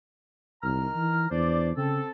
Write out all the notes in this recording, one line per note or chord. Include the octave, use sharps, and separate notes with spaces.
C2 D#3 A#5 F6
E3
E2 D4 C5 D5
C#3 C4 A4